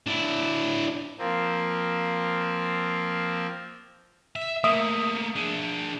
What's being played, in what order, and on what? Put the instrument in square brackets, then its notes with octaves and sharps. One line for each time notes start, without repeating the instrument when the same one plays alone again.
[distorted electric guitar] D4 E4
[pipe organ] F3 A#3 C4
[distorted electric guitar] E5
[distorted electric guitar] A3 A#3 [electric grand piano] E5 D#6
[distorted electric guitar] D4 G#4